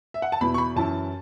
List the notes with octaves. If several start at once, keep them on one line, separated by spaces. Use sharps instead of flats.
E5
F#5
A5
E2 B2 B3 E4 B5
C#6
B5
F#2 E3 C#4 E4 A5